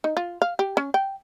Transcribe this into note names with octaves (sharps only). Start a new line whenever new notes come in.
D#4
F4
F5
G4
C#4
G5